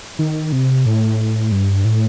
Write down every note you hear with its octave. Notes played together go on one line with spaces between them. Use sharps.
D#3
C3
A2
G2
A2